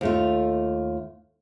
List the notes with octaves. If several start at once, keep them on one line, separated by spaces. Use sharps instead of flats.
D#2 A3 F4